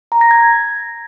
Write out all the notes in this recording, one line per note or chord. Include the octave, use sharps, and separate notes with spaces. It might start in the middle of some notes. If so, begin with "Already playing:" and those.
A#5
A#6
G#6